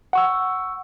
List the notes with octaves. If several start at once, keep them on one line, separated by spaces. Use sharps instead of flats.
F#5 C#6 E6